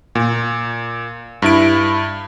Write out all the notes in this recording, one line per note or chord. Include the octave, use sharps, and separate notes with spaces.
A#2
G2 E4 D7